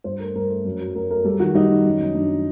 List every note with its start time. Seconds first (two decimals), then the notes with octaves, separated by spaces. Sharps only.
0.04 G2 C5
0.20 A3 A#4
0.35 G2 A#4
0.49 A3
0.65 F#2
0.80 F#3
0.95 F#3 A#4
1.10 A3 A#4
1.25 G3 A4
1.40 D#3 F#4
1.55 G3 D#4
1.70 D#3
1.85 F#2
2.00 F#2
2.15 F#2 D4